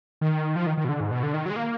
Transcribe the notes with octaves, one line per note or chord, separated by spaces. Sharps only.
D#3
F3
D#3
D#3
B2
D3
G#2
B2
D3
D#3
F#3
G#3
A#3